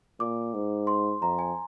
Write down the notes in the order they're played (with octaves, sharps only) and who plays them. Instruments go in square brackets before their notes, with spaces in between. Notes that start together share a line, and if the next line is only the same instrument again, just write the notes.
[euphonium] A#2 [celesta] D6
[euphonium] G#2
[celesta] C6
[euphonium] F2 [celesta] A#5
[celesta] G#5